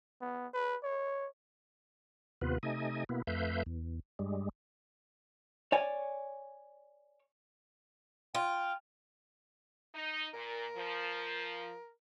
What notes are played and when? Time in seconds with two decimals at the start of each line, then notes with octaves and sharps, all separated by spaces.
0.21 B3
0.53 B4
0.83 C#5
2.41 D#2 C3 B3 F4 B4
2.63 C3 A3 D#4 D#5 G#5
3.09 B2 A#3 B3 E4
3.27 F2 A3 B4 E5 F5 G6
3.66 E2
4.19 G2 G3 G#3
5.72 C#5 D5 G#5
8.35 F4 G5
9.95 D#4
10.34 A#2 A#4
10.76 F3